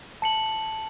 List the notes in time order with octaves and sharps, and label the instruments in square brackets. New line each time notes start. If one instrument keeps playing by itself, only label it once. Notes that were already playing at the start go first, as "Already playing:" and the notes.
[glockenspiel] A5 C#7 F#7